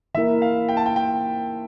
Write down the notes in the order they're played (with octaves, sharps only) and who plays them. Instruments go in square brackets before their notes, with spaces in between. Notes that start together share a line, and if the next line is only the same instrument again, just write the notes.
[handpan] E3 A#3 E4 A#4 [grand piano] E5
[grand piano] F5
G5
A5
G5
G5